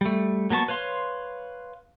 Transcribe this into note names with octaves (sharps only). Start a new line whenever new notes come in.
G3 A3
F#3 A#3 B3 A5 C#6
B4 C#5 F5 C6